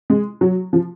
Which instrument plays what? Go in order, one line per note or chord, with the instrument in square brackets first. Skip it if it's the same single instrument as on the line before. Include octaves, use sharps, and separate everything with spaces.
[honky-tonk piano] G#3
F#3
F3